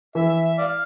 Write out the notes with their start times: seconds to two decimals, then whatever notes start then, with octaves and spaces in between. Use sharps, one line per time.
0.15 E3 E5
0.29 E5
0.44 E5
0.58 D5 F5